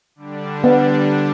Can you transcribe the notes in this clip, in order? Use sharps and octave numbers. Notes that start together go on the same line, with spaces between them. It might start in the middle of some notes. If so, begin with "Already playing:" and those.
D3 G3 D4
B3